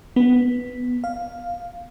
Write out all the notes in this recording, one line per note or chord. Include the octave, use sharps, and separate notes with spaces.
B3
F5